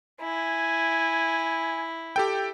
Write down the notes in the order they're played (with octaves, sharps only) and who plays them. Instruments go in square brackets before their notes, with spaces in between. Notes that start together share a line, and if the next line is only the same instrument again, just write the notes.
[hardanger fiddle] E4 [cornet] G#5
[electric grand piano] G4 A4 G5